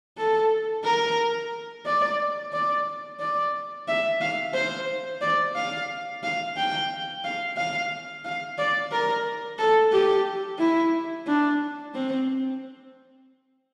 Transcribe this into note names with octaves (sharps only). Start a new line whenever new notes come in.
A4
A#4
D5
D5
D5
E5
F5
C5
D5
F5
F5
G5
F5
F5
F5
D5
A#4
A4
G4
E4
D4
C4